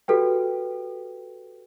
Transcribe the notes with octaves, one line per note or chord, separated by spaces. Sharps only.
F#4 G4 A4 B4 G5